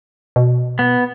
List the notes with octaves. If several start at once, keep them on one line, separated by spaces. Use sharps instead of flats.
B2
B3